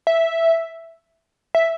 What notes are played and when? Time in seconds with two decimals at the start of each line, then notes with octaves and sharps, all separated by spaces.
0.07 E5
1.55 E5